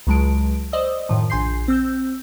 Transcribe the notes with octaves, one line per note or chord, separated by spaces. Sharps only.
C#2 F#3 G#3 A5 D7
C5 D5 D#5 D#6 E6
F#2 A2 D#3 F3
A#1 G#5 C6 G6 C7
C4 E6 G6